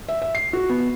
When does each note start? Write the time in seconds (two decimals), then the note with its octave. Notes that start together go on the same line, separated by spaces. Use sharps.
0.09 E5
0.22 E5
0.35 C7
0.53 F#4
0.69 B3